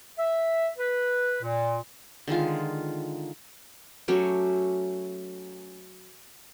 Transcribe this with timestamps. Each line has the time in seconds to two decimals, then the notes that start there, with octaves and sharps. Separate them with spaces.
0.18 E5
0.78 B4
1.42 A#2
2.28 D3 D#3 G#3 F4
4.08 F#3 A3 C#4 G4